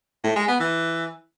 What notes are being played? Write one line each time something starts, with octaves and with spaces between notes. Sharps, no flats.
A2
G#3
B3
E3